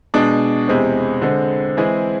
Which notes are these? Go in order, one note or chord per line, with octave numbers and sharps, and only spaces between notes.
B2 G#3 D4
E2 C3 G#3 C4
D3 G#3 C4
E3 G#3 C4 E4 G#4